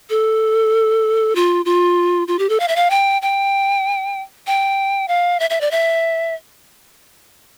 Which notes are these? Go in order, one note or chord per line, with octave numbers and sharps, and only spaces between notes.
A4
F4
F4
F4
G4
A4
F5
E5
F5
G5
G5
G5
F5
E5
E5
D5
E5